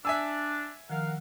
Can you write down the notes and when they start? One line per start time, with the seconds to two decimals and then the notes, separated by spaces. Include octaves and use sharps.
0.05 D4 E5 G#5 E6
0.90 D#3 F3 A#4 F5 F#5